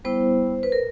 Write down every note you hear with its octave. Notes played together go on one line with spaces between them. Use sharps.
G3 B3 E4 C5
B4
A#4